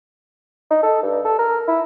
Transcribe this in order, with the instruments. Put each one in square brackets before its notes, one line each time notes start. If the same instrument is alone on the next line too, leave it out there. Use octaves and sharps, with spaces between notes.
[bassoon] D#4
A4
G2
A4
A#4
E4